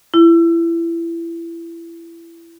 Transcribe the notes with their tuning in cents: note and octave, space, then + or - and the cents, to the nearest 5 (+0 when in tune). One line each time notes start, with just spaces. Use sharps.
E4 +25